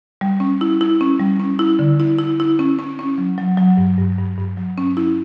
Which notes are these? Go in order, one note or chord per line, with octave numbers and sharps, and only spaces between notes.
G3
C#4
E4
E4
C#4
G3
C#4
E4
D3
E4
E4
E4
C#4
C#4
C#4
F#3
F#3
F#3
G2
G2
G2
G2
F#3
C#4
E4